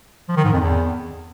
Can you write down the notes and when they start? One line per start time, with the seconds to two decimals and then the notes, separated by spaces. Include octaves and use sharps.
0.28 F3
0.36 D#3
0.44 G#2
0.52 F2
0.60 E2